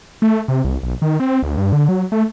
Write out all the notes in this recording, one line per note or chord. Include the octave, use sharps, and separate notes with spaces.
A3
C3
C2
B1
D#3
C4
D2
G2
D3
F#3
A3